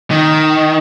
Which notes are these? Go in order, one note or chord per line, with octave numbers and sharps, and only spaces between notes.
D#3